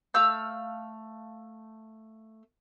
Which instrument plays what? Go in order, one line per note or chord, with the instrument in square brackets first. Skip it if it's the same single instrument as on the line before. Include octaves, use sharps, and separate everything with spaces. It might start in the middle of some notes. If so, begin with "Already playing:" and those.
[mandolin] A3 F5 E6 G6